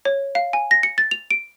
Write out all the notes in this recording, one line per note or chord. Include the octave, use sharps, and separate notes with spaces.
C#5
F5
G#5
A#6
C#7
A6
F7
D7